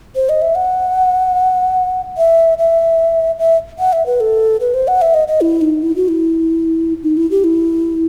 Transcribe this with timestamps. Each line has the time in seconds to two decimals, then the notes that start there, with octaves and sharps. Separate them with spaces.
0.15 C5
0.29 D#5
0.42 E5
0.55 F#5
2.18 E5
2.59 E5
3.39 E5
3.79 F#5
3.93 E5
4.06 B4
4.20 A4
4.61 B4
4.74 C5
4.88 F#5
5.02 E5
5.14 D#5
5.28 D#5
5.41 E4
5.61 D#4
5.82 E4
5.96 F#4
6.08 E4
7.03 D#4
7.17 E4
7.31 G4
7.44 E4